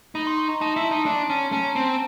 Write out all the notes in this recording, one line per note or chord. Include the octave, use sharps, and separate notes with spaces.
D#4 B5
C6
C#6
A#5
D#4 A5
E4
D#4
D4
C#4
C#4 A5
A#5
C4 A5
G#5